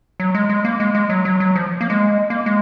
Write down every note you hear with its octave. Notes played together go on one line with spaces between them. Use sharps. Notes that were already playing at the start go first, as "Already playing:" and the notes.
F#3
G#3
G#3
A#3
G#3
G#3
F#3
F#3
F#3
F3
A#3
G#3
A#3
G#3